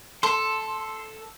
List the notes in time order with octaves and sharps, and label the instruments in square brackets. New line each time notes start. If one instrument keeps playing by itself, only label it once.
[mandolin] A4 [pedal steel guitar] C6